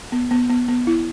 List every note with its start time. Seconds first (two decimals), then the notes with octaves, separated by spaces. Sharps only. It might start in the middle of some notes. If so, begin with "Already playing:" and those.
0.12 B3
0.31 B3
0.49 B3
0.68 B3
0.87 E4